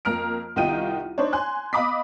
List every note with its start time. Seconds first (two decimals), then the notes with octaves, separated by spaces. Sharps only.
0.05 F2 A#3 A#5 F6 D7
0.56 C2 D#3 D#4 F4 G5 D#7
1.18 D4 D#4 C5 C#5
1.33 G#5 C6 F#6
1.73 D#5 F5 B5 D6 D#6 B6